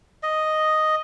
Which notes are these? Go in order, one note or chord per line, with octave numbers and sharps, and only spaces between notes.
D#5